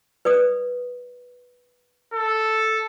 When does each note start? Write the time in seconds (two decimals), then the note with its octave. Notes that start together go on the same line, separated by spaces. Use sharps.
0.25 B4 D5 D#6
2.14 A4